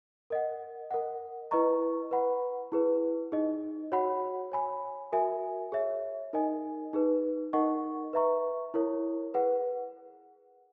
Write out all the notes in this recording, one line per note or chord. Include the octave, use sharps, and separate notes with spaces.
A#4 D#5 F#5
A#4 D#5 F#5
E4 B4 D#5 A#5 C#6
B4 F#5 B5
E4 G#4 B4
D#4 G#4 D#5
F#4 C#5 F#5 B5
C#5 G#5 B5
F#4 A#4 E5 G#5
G#4 C#5 E5
D#4 A#4 D#5 G#5
D#4 G#4 B4
D#4 A#4 D#5 F#5 C#6
B4 E5 A#5 C#6
E4 A#4 C#5
G#4 B4 F#5